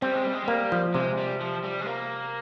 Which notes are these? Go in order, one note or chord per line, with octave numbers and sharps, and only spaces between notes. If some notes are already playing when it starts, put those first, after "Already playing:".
G3 C4
G#3
G3
G#3
G3 A#3
F3
C3 G#3
G3
F3
G3
G#3
A#3